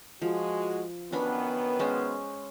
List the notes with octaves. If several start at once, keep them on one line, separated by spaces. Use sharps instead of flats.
F3 G#3 F#4
F#2 D#3 B3 C#4 D4 B5
G#3 C#4 C5